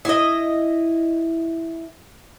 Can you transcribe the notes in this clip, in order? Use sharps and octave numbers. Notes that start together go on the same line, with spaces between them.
E4 D#5